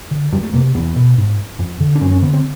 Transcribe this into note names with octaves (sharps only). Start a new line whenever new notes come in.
D3
F2 G3
A3
C3 A#3
E2 B3
B2
G#2
F2
D3
D4
F#2 C#4
C#4
D3 B3
C4